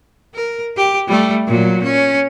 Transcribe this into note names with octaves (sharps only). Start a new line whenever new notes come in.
A#4
G4
G3 A3
A#2 F#3
C#4